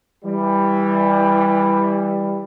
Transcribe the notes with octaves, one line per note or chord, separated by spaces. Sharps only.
E3 G3